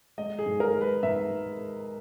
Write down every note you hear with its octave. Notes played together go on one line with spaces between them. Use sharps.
G#3 D#5
G#4
G#2
A#4
G#3
B4
G#2 E5
G#3